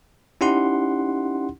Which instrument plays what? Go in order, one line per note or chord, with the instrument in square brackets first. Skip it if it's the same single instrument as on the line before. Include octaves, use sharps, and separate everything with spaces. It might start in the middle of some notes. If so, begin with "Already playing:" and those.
[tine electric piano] C#4 D#4 E4 G4 F#5 C6